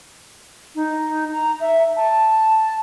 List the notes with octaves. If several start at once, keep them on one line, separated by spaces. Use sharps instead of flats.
D#4
A#5
E5
A5